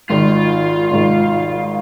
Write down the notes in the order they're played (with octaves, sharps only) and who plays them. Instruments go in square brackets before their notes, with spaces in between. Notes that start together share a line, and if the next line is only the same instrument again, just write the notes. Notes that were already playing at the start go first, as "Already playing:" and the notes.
[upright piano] G#1 G#2 D#3 [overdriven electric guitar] F4
[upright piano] G#1 G#2 D#3